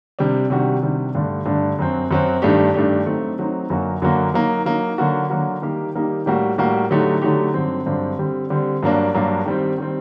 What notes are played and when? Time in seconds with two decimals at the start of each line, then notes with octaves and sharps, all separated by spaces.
0.19 C3 G3 D4
0.50 C3 D#3 G3 D4 F#4
0.83 C3 D#3 G3 D4 F#4
1.15 G2 D3 A3 D4
1.46 G2 D3 A3 D4
1.79 F#2 F#3 C4
2.11 F#2 F#3 C4
2.42 G2 D#3 A3 D4 G4
2.74 G2 D#3 A3 D4 G4
3.06 F#3 A3 C4 D#4
3.39 F#3 A3 C4 D#4
3.70 F#2 D3 F#3 A#3 F#4
4.02 F#2 D3 F#3 A#3 F#4
4.34 F#3 A#3 D#4
4.66 F#3 A#3 D#4
4.98 D3 F#3 A#3 F#4
5.30 D3 F#3 A#3 F#4
5.62 D#3 G3 A#3 D#4 G4
5.94 D#3 G3 A#3 D#4 G4
6.26 A2 G3 A#3 F#4
6.58 A2 G3 A#3 F#4
6.91 D3 F#3 A3 D#4 G4
7.22 D3 F#3 A3 D#4 G4
7.54 G2 D3 F#3 C4
7.86 G2 D3 F#3 C4
8.18 D3 G3 C4
8.50 D3 G3 C4
8.83 G2 F#3 A#3 D4
9.14 G2 F#3 A#3 D4
9.45 D#3 G3 C4
9.78 D#3 G3 C4